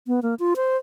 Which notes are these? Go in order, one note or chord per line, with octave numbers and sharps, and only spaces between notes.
B3
A#3
F4
C5